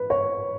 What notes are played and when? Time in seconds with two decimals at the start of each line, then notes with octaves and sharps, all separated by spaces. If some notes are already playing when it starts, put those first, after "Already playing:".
Already playing: B4
0.10 C#5